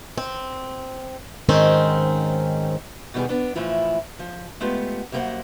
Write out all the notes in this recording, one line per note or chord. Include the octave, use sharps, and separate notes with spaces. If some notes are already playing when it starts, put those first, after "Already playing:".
C4
G#2 D#3 C4 C#4
B2 D#3 G3 B3 G#4
B3 D4
A2 E3 F3 E4 F4
F3
G#3 A3 B3 F4 G4
F#2 G3 A#3 G#4 C5 F#5